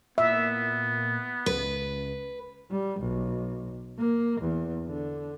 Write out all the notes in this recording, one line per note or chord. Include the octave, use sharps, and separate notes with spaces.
A#2 B3 E5
C#2 B4
G3
B1
A#3
E2
D3